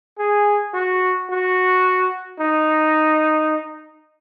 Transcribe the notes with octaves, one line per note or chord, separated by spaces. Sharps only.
G#4
F#4
F#4
D#4